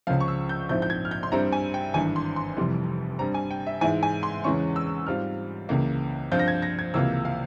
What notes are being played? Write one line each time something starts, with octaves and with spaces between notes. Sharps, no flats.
C#2 C#3 F3 F5
C#6
E6
G6
A#1 G#2 F3 C4 E4 G6
G6
G#6
F6
G6
C6
G2 G3 C4 E4 A#5
G#5
G5
G#1 G2 E3 G#5
C6
C6
F1 F2 E3 G3
G2 G3 C4 A#5
G#5
G5
E5
G#2 E3 G#3 E4 G#5
G#5
C6
E2 C#3 E3 G#3 C#4 C#6
E6
G#2 G3 C4 F4 F6
C#2 C#3 E3 A#3
G2 F3 C4 F4 G6
A#6
G#6
A#6
G#6
C#2 C3 E3 A#3 F4 E6
F5